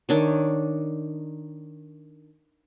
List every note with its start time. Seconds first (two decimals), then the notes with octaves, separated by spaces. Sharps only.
0.09 D#3 D4 C#5